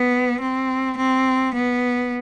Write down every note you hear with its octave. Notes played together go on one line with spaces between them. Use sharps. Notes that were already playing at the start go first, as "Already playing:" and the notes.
Already playing: B3
C4
C4
B3